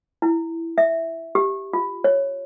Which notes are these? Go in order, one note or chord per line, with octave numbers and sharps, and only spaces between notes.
E4
E5
G4
F4
C#5